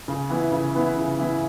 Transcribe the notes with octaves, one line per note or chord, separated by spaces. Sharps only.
C#3
E3 B3 E4
C#3
E3 B3 E4
C#3
E3 B3 E4